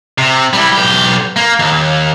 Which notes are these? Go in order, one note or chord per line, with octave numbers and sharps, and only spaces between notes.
C3
G3 E4
B1 G4
A#3
D#2